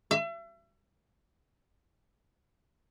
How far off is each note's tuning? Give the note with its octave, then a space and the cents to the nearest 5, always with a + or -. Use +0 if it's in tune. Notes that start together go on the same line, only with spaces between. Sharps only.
E5 +35